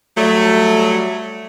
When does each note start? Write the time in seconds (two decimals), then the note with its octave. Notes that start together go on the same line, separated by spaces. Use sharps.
0.17 F#3 G3 A3